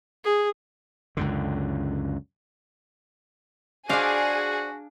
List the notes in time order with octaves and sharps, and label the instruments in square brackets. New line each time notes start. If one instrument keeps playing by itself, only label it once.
[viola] G#4
[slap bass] C#2 F#2 D3
[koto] D4 F5 [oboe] F#4 [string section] G#4 [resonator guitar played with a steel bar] C5 D5